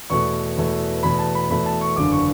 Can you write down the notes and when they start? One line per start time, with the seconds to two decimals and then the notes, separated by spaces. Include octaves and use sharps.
0.10 E2 B2 A3 C#6
0.57 E2 B2 A3
1.03 E2 B2 A3 B5
1.19 A5
1.35 B5
1.49 E2 B2 A3 B5
1.66 A5
1.81 C#6
1.96 F#1 E2 D3 D6
2.12 C#6